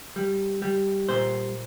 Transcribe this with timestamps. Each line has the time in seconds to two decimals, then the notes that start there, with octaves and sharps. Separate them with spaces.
0.16 G3
0.62 G3
1.09 A#2 C5